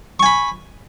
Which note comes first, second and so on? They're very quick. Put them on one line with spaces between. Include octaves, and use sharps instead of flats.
C#6 G#5 B5